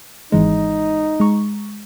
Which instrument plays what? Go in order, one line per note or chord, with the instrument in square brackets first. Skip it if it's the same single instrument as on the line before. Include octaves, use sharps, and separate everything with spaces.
[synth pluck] G#1 E3 G#3 [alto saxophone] D#4
[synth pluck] G#3 A#5 C#6